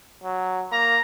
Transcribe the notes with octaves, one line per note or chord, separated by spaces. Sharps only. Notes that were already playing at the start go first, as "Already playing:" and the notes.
F#3
A#3 A#5